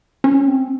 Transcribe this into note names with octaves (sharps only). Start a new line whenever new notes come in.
C#4
C4